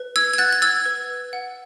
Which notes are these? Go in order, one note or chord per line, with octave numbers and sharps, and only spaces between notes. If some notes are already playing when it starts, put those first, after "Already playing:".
Already playing: B4
E6 G#6
G#6
F#5 F#6 A6
A6
E6 G#6
B4
F#5